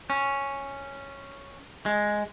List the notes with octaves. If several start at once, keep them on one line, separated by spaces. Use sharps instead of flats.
C#4
G#3